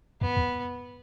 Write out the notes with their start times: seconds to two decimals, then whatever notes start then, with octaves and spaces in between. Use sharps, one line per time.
0.21 F2 B3
0.37 E2